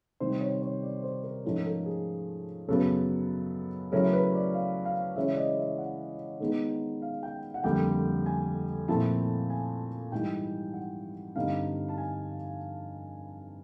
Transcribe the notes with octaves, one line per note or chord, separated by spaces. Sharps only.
C3 D#3 G3 C5
C#5
C#5
D5
C5
A#4
G#2 F3 A3 C#4 A#4
A#4
A4
G#4
F#2 C#3 F#3 B3 A4
C#3 F#3 A3 C#4 E4 A#4
B4
D5
F5
F5
C#3 E3 G#3 C#4 E4 E5
D5
D#5
E5
F#5
D#3 G#3 B3 D#4
F5
G5
F#5
F2 D3 G3 A#3 G5
G#5
A#2 F3 A3 C4 E4 A5
G#5
G#2 E3 G3 G5
F#5
G2 D3 G3 C4 D#4 F5
A5
G#5